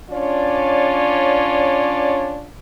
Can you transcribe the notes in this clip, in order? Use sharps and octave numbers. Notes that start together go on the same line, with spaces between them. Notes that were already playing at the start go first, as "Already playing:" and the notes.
C#4 D4 F4 C#5 D5